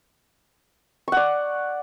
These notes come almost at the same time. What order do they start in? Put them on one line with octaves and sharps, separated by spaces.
C#6 F#5 D5